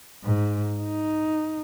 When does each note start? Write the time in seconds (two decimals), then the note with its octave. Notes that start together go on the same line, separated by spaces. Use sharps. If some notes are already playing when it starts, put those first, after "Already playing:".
0.24 G#2
0.81 D#4